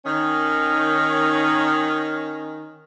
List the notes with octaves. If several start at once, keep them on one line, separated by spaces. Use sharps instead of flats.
D#3 C#4